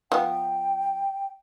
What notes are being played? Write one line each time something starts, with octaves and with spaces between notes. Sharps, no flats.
F3 B3 G5